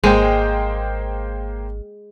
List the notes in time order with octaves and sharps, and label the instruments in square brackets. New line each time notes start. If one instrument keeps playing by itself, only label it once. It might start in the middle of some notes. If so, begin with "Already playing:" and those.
[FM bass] G#1 [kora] G#3 [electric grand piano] A#3 C5 G5